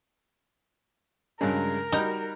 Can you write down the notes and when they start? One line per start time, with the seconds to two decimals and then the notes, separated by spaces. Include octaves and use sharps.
1.41 G2 C#3 F#3 G#3 A#4
1.92 G3 D#4 F#4 A#5 G6